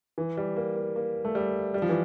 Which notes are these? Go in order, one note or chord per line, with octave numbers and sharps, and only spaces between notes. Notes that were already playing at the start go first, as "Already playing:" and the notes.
E3
G3
A#3
A#3
A#3
A3
G3
G3
F3
E3